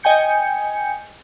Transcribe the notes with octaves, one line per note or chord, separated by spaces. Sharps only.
D#5 G5 G#5 G6 C#7